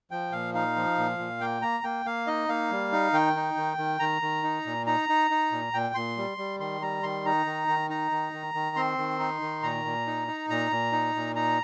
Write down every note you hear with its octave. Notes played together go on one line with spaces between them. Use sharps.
F3 G5
A#2 F5
D#4 F5
F3
A#2
A#2
A#3 G5
A#3 A#5
A#3 G5
A#3 F5
D#4 D#5
A#3 F5
G3
D#4
D#3 G5
D#4
D#3
D#3
D#3 A#5
D#3
D#4
A#2
D#4 A#5
D#4
D#4
A#2
A#2 G5
A#2 C6
G3
G3
D#3 C6
G3 A#5
D#3 C6
D#4 A#5
D#3
D#3
D#4 A#5
D#3
D#3
D#3
C4 C6
D#3
D#4
D#3
A#2 A#5
A#2
D#4
D#4
A#2 A#5
A#2
D#4
A#2
D#4 A#5